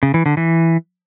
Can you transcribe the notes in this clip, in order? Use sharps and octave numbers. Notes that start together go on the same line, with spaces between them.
C#3
E3
D3
E3